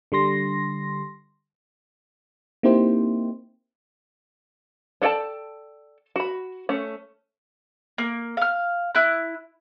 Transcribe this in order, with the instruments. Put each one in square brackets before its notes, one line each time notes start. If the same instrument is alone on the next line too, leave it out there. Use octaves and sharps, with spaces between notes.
[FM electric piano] D3 G3 C6 A#6
A#3 C4 D#4 E4 G4 C5
[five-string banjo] D4 A4 D5 G5 A5
F#4 B5
A3 C#4
[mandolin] A#3
F5 F6
E4 F#6